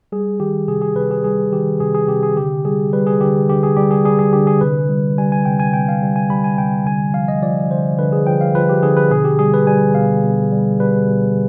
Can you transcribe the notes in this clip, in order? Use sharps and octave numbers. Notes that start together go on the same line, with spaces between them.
G3 G#4
D#3 G4
C3 G#4
G#4
C3 B4
G#4
G3 G#4
D#3 G4
C3 G#4
G#4
C3 G4
G#4
D3 G4
G3 G#4
G3 B4
G#4
D3 G4
D3 G4
G#4
G3 G4
G#4
G3 G#4
G#4
D3 G4
G#4
C3 B4
G3
G3 G#5
G#5
C3 G5
G#5
C3 G5
F5
G3
G#5
G3 B5
G#5
C3 G5
D3 G#5
F3 F5
D#5
F3 D5
D3 C5
D3 B4
G#4
F3 G5
F5
F3 B4
G4
D3 G#4
B4
B2 G#4
G4
G3 G#4
B4
G3 G#5
B2 F5
B2
G3
G3 B4
B2